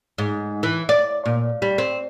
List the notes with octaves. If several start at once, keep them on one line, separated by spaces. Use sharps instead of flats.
G#2
E3
D5
A#2
G3
C4